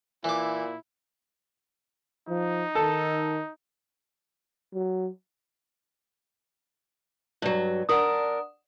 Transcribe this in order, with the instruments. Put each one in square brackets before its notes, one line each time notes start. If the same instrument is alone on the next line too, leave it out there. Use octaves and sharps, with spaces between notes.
[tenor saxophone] A#2 [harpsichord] E3 D6 [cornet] E4
[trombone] F3 [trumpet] D#4
[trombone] D#3 [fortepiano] A4
[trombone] F#3
[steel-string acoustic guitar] G2 F#3
[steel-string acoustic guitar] D4 A#4 [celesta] F#5 D#6